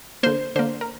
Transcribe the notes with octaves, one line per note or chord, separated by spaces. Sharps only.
D3 A#3 C5
D3 A#3 C5
A#4